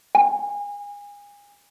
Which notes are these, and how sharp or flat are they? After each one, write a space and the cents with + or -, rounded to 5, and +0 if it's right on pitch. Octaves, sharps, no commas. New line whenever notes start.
G#5 -30